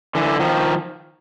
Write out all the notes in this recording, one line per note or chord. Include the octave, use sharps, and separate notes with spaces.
D3 E3
D#3 F3